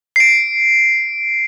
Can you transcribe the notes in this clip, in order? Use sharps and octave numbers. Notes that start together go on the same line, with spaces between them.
C7 D7